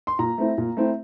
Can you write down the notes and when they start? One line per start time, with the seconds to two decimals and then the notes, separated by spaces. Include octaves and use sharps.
0.07 C6
0.19 A#2 A#5
0.38 A3 C4 E4
0.58 A#2
0.77 A3 C4 E4